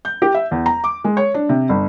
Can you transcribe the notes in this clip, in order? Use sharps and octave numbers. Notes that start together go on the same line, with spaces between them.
G6
G4
E5
E2
A#5
D6
G#3
C#5
D4
C3
G1